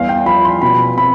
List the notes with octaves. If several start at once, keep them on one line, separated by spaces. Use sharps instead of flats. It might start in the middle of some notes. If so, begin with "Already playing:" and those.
Already playing: E2 G3 F5
G5
F3 B5
C6
B2 B5
C4 B5